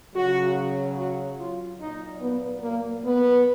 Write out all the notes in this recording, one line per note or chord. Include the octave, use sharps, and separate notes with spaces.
C#3 F#3 F#4
F#4
F4
A#2 F#3 D#4
B3
A#3
B3